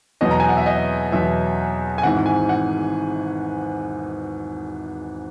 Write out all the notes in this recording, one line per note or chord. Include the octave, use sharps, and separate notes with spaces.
E2 B2 F#3 D#5
A#5
G#5
F#5
E5
D#5
E2 B2 F#3 E5
G#5
G#1 G#2 E3 F#5
G#5
F#5